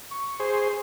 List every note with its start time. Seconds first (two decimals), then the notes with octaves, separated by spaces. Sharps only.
0.11 C#6
0.40 G#4 C5